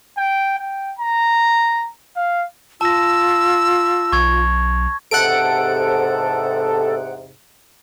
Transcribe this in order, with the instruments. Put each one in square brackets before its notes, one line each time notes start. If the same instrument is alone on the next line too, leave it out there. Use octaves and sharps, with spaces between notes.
[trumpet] G5
G5
A#5
F5
[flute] F4 [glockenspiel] A5 A#6 [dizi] E6
[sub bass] B1 [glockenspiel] C#6 G#6
[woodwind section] E2 G#2 C3 [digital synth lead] A4 [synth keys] F#5 D7